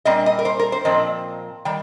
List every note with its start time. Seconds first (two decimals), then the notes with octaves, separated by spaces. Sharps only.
0.05 A#2 G3 C4 D#5
0.26 D#5
0.39 A#4
0.45 C5
0.59 A#4
0.72 C5
0.85 A#2 F3 C4 D#5
1.65 D#3 G3 G5